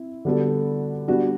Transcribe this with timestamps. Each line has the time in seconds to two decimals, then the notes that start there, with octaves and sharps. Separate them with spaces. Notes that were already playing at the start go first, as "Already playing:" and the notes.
Already playing: C4 E4
0.25 D3 G3 B3 F#4 A4
1.08 G3 B3 D4 F#4